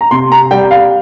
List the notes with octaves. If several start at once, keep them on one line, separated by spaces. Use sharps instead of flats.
A#5
C3 C6
A#5
G3 G5
F5